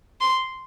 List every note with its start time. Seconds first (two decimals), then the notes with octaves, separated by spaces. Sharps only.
0.21 C6